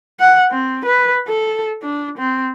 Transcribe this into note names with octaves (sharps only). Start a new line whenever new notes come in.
F#5
C4
B4
A4
D4
C4